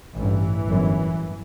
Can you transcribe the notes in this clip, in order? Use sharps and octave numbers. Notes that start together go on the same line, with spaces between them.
A1 G2 E3
G1 F#2